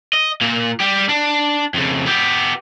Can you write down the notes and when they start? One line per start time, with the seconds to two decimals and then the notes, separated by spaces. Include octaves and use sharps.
0.13 D#5
0.41 A#2 A#3
0.80 G3 G4
1.09 D4
1.74 F2 C#3
2.06 B3 G4